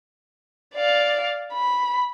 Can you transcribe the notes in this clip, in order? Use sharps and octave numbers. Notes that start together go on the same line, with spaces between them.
D5 F5
B5